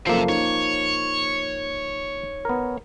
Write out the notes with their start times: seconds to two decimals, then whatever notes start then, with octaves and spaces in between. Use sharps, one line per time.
0.07 F#1 F3 A#3 C4 A4 E5 C7
0.29 D#4 C#5
2.45 B3 A#4